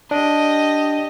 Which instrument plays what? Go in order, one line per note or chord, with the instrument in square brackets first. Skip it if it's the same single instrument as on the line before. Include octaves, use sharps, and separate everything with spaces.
[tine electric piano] D4 [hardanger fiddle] G4 D#5